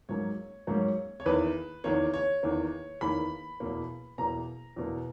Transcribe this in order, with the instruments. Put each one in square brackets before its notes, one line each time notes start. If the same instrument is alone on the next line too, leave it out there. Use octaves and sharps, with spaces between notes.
[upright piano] G#2 F#3 A#3 C#4 C#5
G#2 F#3 A#3 C#4
C#5
E2 D#3 A#3 B4
E2 D#3 A#3 C#5
C#5
E2 D#3 A#3
E2 D#3 A#3 B5
E2 B2 A#3
E2 B2 A#3 A#5
E2 B2 A#3